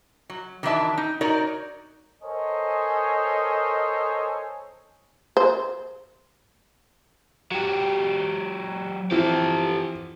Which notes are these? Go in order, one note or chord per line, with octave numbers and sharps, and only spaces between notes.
F#3
D#3 E3 F#3 D4 E5 A5
D#4
D#4 F#4 A#4 C#5 D5
A4 A#4 C5 C#5 D#5 G#5
C5
F#3 G4
E3 F3 C4 G4 A4